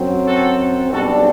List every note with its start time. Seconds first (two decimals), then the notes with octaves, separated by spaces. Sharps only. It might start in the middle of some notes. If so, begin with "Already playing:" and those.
Already playing: F#2 F#3 C4
0.25 F#4 A4
0.89 B1 B2 G3 D4 F#4 A4